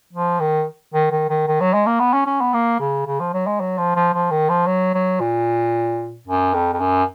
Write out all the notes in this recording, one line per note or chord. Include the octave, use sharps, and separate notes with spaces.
F3
D#3
D#3
D#3
D#3
D#3
F#3
G#3
A#3
B3
C#4
C#4
B3
A#3
C#3
C#3
F3
F#3
G#3
F#3
F3
F3
F3
D#3
F3
F#3
F#3
A#2
F#2
F2
F2
F#2